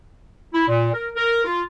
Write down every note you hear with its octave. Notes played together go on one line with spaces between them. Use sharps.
E4
A#2
A#4
A#4
F4